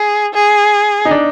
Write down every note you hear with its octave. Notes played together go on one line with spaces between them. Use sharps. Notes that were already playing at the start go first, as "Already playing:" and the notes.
Already playing: G#4
G#4
D#4
D4